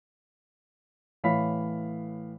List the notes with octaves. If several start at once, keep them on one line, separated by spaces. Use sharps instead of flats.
A2 E3 C#5 F5 B5 B6